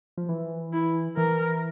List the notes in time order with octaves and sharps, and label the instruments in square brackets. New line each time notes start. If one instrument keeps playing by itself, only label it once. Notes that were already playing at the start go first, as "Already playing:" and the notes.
[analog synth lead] F3
E3
[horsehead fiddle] E4
[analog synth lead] E3 [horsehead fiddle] A#4